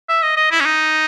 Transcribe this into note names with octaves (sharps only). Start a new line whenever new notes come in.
E5
D#5
D#5
E4
C#4
D#4